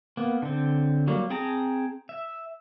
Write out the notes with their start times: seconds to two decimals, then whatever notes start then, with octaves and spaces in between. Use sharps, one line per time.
0.17 A#3 B3
0.42 D3 C4
1.08 F#3 G3 A#3
1.30 C4 G#4 G5 A5 A#5
2.09 E5